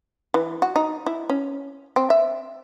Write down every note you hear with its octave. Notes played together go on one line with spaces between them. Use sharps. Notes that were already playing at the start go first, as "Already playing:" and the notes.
E3
F#4
D#4
E4
C#4
C4
E5